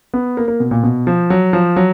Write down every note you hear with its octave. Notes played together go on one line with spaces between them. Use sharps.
B3
A#3
A#3
B2
A#2
B2
F3
F#3
F3
F#3